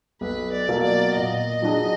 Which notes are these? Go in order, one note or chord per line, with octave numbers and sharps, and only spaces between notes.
B1 B4
D5
B2 F#3 A#3
D5
A#2 D#5
F#3 D4 G#4